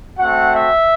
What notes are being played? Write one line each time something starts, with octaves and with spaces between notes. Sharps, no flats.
A3 C4 F#4 F#5
E5